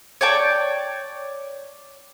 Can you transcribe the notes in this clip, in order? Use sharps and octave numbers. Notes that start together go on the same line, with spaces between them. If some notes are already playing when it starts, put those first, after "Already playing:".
C#5 D5 G5 A5